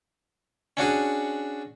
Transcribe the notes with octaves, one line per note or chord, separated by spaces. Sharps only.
C#4 D4 F#4 G#4